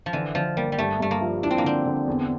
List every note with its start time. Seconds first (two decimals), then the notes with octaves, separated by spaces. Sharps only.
0.06 F3
0.13 D3 E3
0.35 D3 F3
0.57 G3 A#3
0.72 G3
0.78 G2 A3
1.00 G2 A3
1.11 A#3
1.21 F3
1.43 D4 E4
1.51 C4
1.58 A#3
1.64 D3 C4
1.86 D3
2.07 E2